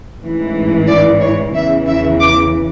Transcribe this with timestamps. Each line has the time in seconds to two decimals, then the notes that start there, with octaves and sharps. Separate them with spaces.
0.21 A1 G#2 E3
0.87 D5
1.21 C#5
1.54 E2 C#3 E3 E5
1.87 E5
2.21 D6